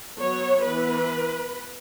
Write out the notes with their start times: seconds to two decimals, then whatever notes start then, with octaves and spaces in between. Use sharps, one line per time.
0.18 F#3 B3 C#5
0.64 E3 B3 B4